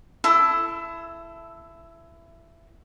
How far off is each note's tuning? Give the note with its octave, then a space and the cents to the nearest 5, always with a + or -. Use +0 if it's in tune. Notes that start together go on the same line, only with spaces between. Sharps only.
E4 +20 A4 +0